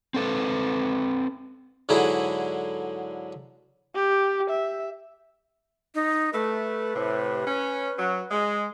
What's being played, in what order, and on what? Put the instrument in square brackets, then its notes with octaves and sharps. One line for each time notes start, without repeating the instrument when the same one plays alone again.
[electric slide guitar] C4 A4 B4
[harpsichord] G#2 D3 F#3 E4 G#4
[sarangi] G4
E5
[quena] D#4
[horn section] A3 [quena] B4
[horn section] A2 C3
C#4
F#3
G#3